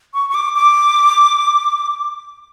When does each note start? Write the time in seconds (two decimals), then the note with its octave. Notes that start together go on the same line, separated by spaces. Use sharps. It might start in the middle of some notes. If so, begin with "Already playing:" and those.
0.14 C#6
0.30 C#6
0.35 D6
0.56 D6